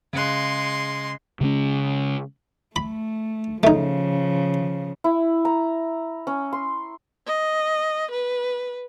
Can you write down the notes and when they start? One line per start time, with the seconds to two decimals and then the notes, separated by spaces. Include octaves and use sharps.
0.13 C#3 G#3 C6 F#6
1.41 C#3 G#3 C#4
2.76 A3 B5
3.63 C#3 F3 A3 D#4
5.04 E4
5.45 A#5
6.27 C#4
6.53 C6
7.27 D#5
8.11 B4